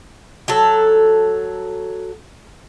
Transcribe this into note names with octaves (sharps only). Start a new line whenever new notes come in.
F#3 A4